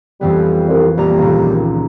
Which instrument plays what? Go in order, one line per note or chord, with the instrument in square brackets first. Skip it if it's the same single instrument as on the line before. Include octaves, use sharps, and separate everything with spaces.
[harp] F2 E3 B3 [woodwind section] G3
[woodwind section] C2
[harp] A#1 A#5 [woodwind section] G3 A#3
[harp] D#1 C#2